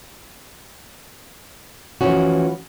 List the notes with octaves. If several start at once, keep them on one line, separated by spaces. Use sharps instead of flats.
E3 F3 A3 C#4 F#4